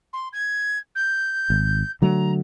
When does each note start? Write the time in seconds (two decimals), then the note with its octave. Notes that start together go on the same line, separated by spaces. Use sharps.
0.13 C6
0.33 G#6
0.95 G6
1.50 G#1
2.02 D3 F#3 A3 A#5